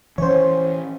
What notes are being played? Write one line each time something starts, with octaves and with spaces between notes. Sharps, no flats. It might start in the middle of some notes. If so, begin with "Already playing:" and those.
E3 C#4 C5 C#5